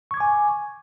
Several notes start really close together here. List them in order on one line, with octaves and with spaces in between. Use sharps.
C#6 G#6 D6 G#5